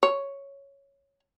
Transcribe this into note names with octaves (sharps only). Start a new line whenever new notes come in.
C#5